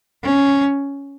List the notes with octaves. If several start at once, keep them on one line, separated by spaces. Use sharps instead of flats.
C#4